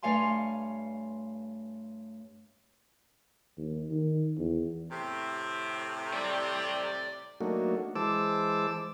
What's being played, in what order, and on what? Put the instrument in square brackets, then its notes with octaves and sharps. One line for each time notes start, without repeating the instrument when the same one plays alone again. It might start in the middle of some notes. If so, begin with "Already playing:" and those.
[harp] G2 A3 C#5 F5 G#5 C6
[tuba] D#2
D#3
E2
[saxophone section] A2 C3
[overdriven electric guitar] D5 G5
[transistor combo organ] F#3 A3 A#3 D4 D#4 F#4
E3 G#3 C5 A5 D6 E6